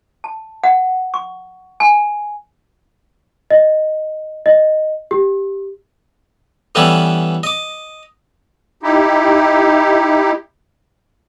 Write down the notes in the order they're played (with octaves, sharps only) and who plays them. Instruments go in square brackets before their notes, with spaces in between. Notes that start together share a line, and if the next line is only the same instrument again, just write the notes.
[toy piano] A5
F#5
C#6
G#5
[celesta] D#5
D#5
G4
[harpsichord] E3 G3 B3 C#4 A4 D5
D#5 D6
[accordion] D#4 E4 G4